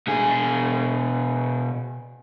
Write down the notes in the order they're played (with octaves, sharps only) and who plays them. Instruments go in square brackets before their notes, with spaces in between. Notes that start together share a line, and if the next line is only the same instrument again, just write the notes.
[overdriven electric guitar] B2 G#4